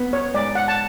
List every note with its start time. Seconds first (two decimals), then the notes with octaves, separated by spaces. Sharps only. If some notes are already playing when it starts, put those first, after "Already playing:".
Already playing: B3
0.13 C#5
0.34 G#2 D5
0.55 F#5
0.68 A5